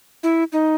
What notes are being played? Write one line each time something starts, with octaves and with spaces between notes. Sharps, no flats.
E4
D#4